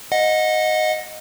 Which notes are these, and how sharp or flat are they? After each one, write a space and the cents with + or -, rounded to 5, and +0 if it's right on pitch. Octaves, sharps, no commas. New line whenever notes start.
D#5 +0 F#5 -25